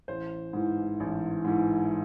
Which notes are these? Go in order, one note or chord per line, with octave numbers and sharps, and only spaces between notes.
A1 C5
G#2 E3
A1
G#2 E3